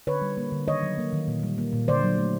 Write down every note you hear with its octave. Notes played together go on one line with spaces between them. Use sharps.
D3 B4 C#5
G3
A#3
D3
D#3 C#5 D#5
F#3
A#3
D#3
A#2
G3
A#3
A#2
D3 C5 D5
F#3
A3